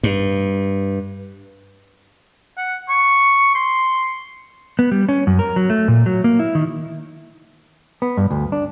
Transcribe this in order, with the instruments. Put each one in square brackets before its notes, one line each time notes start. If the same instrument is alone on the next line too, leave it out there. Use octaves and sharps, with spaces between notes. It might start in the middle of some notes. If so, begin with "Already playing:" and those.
[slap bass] G2
[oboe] F#5
C#6
C6
[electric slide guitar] B3
G3
C#4
F#2
A#4
F#3
A3
A#2
F#3
A#3
E4
D#3
[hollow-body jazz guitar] B3
G2
D2
D4